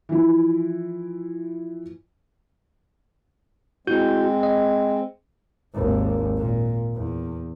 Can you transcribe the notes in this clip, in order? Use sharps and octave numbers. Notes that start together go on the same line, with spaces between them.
E3 F3 E4
G#3 C4 E4 F#4 G6
D#5
G#1 D#2
A#2
E2